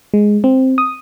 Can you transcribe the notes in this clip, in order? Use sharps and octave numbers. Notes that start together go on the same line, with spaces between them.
G#3
C4
D#6